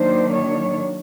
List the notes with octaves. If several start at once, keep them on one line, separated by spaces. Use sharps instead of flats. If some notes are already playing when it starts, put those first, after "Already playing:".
Already playing: D#3 F#3 A#3 D4 C5
C#5